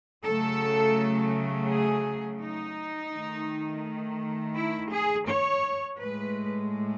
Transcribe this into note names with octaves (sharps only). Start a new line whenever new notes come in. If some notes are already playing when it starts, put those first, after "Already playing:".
C#3 F#3 A3 A4
G#4
D#4
D#3 A3
E4
G#4
C#5
A2 G#3 B4